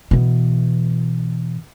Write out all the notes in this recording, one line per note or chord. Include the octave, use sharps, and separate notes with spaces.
B2 E3